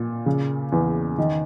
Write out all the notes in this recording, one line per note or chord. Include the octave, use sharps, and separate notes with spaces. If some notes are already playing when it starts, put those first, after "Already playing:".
Already playing: A#2
C#3
E2
D#3